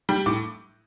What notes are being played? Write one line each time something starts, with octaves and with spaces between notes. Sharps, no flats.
G3
A2 D6